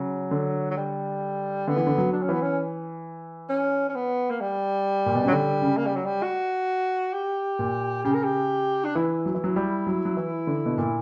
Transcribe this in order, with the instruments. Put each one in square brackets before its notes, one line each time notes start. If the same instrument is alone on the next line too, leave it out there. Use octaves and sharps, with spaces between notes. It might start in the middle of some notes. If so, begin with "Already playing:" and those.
Already playing: [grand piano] C#3 [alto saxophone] F#3
[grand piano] D3
[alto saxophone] F#3
G3
[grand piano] D3 [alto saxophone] B3
[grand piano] E3
D3
F#3
[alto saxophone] D4
C#4
[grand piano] E3 [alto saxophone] B3
[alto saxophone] C#4
C#4
C#4
B3
A#3
G3
[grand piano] A#2
B2
C#3
[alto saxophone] F#3
[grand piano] D3 [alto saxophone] G3
[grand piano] C#3
[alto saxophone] A#3
G3
F#3
G3
F#4
G4
[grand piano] A#2
[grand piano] C#3 [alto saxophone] G4
[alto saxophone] A#4
G4
D4
[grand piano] E3 [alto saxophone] E4
[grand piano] F#3
E3
F#3
G3
F#3
F#3
E3
D3
B2
A#2